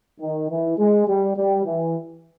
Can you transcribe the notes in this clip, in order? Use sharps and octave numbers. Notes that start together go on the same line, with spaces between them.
D#3
E3
G#3
G3
G3
E3